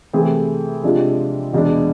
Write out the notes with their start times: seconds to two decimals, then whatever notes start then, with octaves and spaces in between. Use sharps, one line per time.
0.13 C3 E3 A3 C4 G#4
0.84 C3 F3 G#3 D4 F4
1.53 E2 B2 G#3 D4